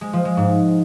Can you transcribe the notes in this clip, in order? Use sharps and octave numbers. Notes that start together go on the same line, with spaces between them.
G#3
F3
G#3
G#2